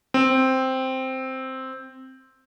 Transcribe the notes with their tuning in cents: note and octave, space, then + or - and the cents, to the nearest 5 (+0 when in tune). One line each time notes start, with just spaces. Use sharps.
C4 +0